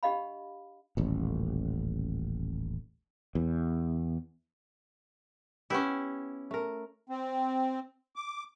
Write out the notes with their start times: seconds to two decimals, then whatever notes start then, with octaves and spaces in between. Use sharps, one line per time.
0.03 D4 G4 D#5 F5 B5
0.97 D#1 A1
3.35 E2
5.70 B3 C#4 E4 G4
6.51 A3 A#4
7.09 C4
8.16 D6